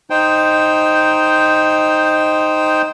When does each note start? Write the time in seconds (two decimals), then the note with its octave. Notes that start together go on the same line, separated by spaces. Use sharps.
0.10 D#4 C5 G5